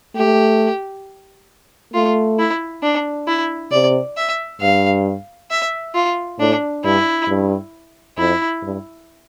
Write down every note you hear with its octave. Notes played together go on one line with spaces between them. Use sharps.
A3 G4
A3 F4
E4
D4
E4
C3 D5
E5
G2 F5
E5
F4
A2 D4
G2 E4
G2
F2 E4
G2